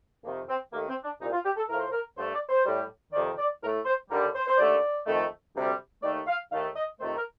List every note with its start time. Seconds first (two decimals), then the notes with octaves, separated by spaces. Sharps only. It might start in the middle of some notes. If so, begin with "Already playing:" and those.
0.23 F2 C3 D#3 A#3
0.48 C4
0.72 D#2 D#3 A3 A#3
0.89 C4
1.04 D4
1.20 C2 A#2 G3 D#4
1.32 F4
1.45 G4
1.57 A4
1.69 A2 F3 A3 A#4
1.80 C5
1.91 A#4
2.17 G2 D3 A3 C5
2.33 D5
2.49 C5
2.65 A2 G3
3.13 F2 C3 D#3 D5
3.38 D5
3.62 A2 A#4
3.65 A3
3.85 C5
4.10 D#2 D3 G3 A#4
4.35 C5
4.47 C5
4.58 D#2 D3 A3 D5
5.06 F2 D#3 A3
5.54 D2 C3 G3
6.03 D#2 D#3 A3 D5
6.27 F5
6.51 D#2 D#3 A3 F5
6.76 D#5
7.00 F2 C3 D#3 A3 C5
7.16 A#4